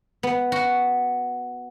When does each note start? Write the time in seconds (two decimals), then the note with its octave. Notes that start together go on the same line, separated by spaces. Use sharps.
0.23 B3
0.52 F#4